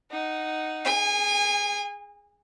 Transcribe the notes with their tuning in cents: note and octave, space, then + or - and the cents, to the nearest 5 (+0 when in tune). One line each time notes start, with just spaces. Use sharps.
D#4 +0 F#5 +10
G#4 +0 G#5 -30